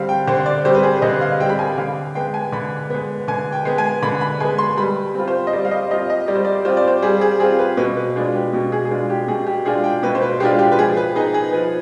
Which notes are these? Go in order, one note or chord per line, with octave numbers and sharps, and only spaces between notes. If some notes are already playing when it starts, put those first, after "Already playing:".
Already playing: D3 G3 C4 F5
G5
D3 C5
D5
G3 C4 C5
B4
G#4
D3 D#5
F5
G3 C4 G5
B5
G#5
D3 F5
G#3 B3 G5
G#5
D3 B5
G#3 B3
D3 G#5
G5
G#3 B3
G#5
D3 B5
B5
G#3 B3 G#5
C6
G3 B5
C4 F4
C5
D#5
G3 D5
F5
D#5
C4 F4 D#5
D#5
G3 D5
C5
D5
C4 F4 C5
D5
C5
G3 G#4
G#4
C4 F4 G#4
B4
B2 B4
B4
G#3 D4 F4
G4
B2
G#4
G#4
G#3 D4 F4 B4
G4
B2 G#4
G4
G#3 D4 F4 G#4
G5
B2 B4
C5
B4
G#3 D4 F4 G4
G4
B4
F3 G#4
B4
B3 D#4 G#4
G#4
F3 B4